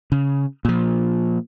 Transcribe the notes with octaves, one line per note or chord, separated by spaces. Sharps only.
C#3
A#2 F3